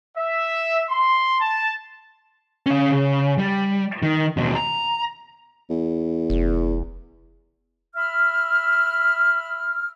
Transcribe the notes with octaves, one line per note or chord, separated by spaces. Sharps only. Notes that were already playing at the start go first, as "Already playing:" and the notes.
E5
C6
A5
C#4 F5
C#3
G3
D#3
D#2 B2
A#5
E2
F1
E5 B5 E6 F6